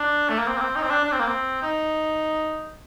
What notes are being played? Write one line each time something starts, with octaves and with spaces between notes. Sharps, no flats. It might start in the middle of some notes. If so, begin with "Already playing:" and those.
Already playing: D4
A3
A#3
C4
A#3
C4
D#4
C4
D4
D4
C4
A#3
C4
D#4